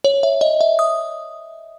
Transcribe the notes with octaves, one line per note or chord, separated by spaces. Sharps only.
C#5
E5
D#5
E5
D#6